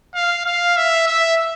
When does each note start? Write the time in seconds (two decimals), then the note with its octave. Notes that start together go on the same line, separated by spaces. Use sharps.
0.14 F5
0.46 F5
0.77 E5
1.07 E5